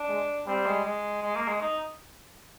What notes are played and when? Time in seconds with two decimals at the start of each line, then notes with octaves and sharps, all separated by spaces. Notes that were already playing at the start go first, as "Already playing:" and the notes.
Already playing: D4
0.09 G#3
0.47 G3 C4
0.66 G#3
0.84 G#3
1.22 G#3
1.36 A#3
1.48 G#3
1.61 D#4